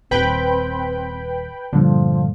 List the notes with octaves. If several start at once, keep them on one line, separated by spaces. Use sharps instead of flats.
D#1 C4 B4 G5 B5
G2 A#2 D3 F3